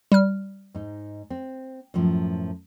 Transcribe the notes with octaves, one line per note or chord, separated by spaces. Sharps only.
G3 F6
G#2 D#4
C4
F#2 A2 F3